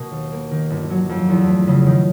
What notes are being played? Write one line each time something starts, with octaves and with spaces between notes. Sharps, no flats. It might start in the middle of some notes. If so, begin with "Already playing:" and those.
Already playing: B2 A#3
D#2
A#3
D#3
G1
F#3
F2
E2
A3
C#3
D#3